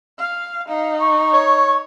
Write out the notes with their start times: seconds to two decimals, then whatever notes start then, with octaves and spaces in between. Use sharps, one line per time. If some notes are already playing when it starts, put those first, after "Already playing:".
0.18 F5
0.68 D#4 F5
1.00 C#6
1.33 C#5